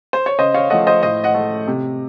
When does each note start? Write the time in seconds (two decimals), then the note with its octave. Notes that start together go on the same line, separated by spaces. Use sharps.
0.13 C5
0.26 C#5
0.38 C#3 C5 D#5
0.54 C#5 F5
0.70 F3 A3 D#5 F#5
0.87 C5 D#5
1.03 A2 C5 D#5
1.24 D#5 F#5
1.34 A3
1.67 C3